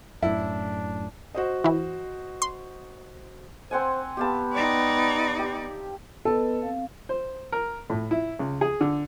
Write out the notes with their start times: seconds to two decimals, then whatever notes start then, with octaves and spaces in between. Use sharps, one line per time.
0.22 F#2 A2 D4 E4
1.35 F#4 C5 D#5
1.64 E3 E4
2.42 C6
3.71 C4 C5 F#5 G#5
4.17 B3 G4 F5 A5
4.53 D#4 D5
5.39 G4
6.25 B3 A4 B4 D#5
6.62 C4 F5
7.09 C5
7.52 A#4
7.90 A2
8.11 E4
8.39 C#2
8.61 G#4
8.81 D3